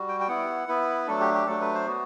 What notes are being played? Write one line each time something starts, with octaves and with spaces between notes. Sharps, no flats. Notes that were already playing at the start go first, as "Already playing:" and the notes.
Already playing: G3 F#4
G5
G5
B3 E4 F#5
B3 E4 B4
F#3 A3 D4 A4
G4
G4
F#3 A3 D4 A4
B4
C5
B3 F#4